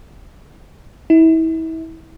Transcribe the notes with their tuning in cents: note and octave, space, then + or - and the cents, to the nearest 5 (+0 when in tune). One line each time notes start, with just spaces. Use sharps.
E4 -35